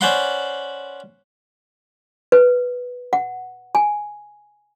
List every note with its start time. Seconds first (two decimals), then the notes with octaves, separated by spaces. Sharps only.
0.01 C#4 C5 D5 F#5 B5 C6
2.32 B4
3.13 F#5
3.75 G#5